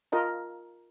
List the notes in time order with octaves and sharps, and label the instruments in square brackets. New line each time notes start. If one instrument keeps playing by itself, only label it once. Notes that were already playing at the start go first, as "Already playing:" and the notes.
[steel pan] F4 A#4 D#5 A5